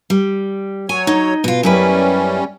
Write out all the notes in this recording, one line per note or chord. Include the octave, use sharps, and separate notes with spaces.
G3
F#3 C#5 G#5
D#4
B2 F4
F#2 G3 C#4 E4 B4